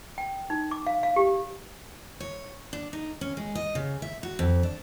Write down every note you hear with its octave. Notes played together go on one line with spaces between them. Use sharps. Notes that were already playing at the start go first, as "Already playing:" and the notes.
G5
D#4
D6
F5
F5
G4
C#5
D4
D#4
C#4
G#3
D#5
C#3
E5
F#4
F2
D4